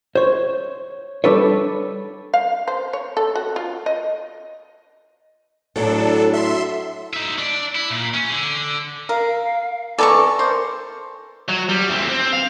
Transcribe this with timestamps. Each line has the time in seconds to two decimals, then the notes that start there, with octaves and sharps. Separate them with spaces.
0.15 C5 C#5
1.24 G3 D4 A4 B4 C#5
2.34 F5
2.68 C5
2.93 C#5
3.17 A4
3.35 F#4
3.56 F4
3.86 D#5
5.76 A2 F#3 D4 A4
6.33 E5 C6
7.13 D#4 E5
7.38 D4 D5
7.75 E4
7.91 A#2
8.14 C#4
8.29 D3
9.09 A#4 F5
9.98 E3 B3 A4 D5 A#5 C#6 D6
10.39 A#4 C5
11.49 F#3
11.69 G3
11.89 D2 C4
12.09 C4
12.33 F5